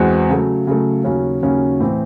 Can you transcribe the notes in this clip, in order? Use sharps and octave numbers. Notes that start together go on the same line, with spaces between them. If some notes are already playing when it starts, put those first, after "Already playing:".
Already playing: E2 G#3 C4 F#4
C#3 F#3 A3
C#3 F#3 A3
D#2 C#3 F#3 C#4 F#4
D#2 C#3 F#3 C#4 F#4
A2 E3 C4